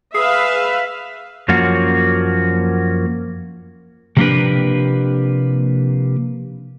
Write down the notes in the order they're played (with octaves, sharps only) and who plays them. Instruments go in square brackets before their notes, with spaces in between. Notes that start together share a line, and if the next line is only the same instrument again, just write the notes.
[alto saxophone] G#4 [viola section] B4 E5 F5
[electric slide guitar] F#2 F3 A#3 C#4 F#4
C3 F3 A#3 D4 G4 B4